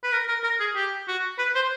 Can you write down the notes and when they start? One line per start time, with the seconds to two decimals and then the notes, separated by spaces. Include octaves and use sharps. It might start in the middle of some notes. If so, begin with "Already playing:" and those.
0.03 B4
0.12 A#4
0.28 A#4
0.43 A#4
0.60 G#4
0.75 G4
1.08 F#4
1.38 B4
1.55 C5